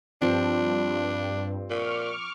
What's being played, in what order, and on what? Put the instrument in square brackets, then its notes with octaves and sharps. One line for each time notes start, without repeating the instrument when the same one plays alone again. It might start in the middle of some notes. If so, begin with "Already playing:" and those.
[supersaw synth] G2 [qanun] F3 [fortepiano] C4 [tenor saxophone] D4
[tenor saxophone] A#2 [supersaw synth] C#6 D6 F6